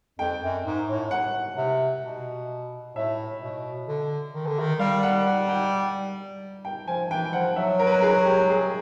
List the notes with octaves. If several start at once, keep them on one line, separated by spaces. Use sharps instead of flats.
F2 G5
F#2
G#2
A2
F#5
C3
B2
A2 E5
B2
D3
D#3
D3
D#3
G3 F5
F#5
F#5
G5
G5
F3 G#5
E3 G5
F3 F#5
F#3 E5
A#4
B4
A#4
G#4
G4
G#4